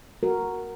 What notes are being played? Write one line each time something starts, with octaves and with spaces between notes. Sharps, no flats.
F#4 A#4